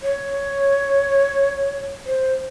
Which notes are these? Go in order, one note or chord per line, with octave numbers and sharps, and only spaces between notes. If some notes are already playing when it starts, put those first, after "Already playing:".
C#5
C5